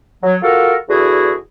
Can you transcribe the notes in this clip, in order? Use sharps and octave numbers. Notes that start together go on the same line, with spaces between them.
F#3
F4 F#4 A4 A#4
E2 D3 E4 F#4 G#4